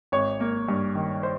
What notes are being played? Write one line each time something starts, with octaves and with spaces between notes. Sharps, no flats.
G#1 C#5
A#3
G2
D#3
C5